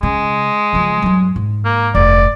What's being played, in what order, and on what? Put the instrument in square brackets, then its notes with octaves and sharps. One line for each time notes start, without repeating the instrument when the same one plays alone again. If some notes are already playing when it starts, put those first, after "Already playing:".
[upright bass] C#3 [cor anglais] G#3
[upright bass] C#3 F3
G2 F#3
G#2
[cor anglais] A#3
[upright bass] F1 G2 [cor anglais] D5